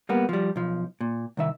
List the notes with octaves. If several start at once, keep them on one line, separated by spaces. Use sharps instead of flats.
G3 A#3 B3
F3 G3
B1 F3
A#2
C2 D#3 E5